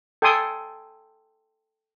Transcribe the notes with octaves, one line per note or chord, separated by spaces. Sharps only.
A4 G5 G#5 C6 D#6